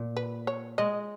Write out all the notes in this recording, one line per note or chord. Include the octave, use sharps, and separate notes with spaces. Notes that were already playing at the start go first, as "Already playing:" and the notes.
Already playing: A#2
B4
C#5
G#3 D#5